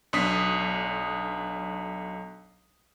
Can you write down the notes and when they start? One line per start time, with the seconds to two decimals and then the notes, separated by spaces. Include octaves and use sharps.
0.13 B1 D4 D#6 B6 C7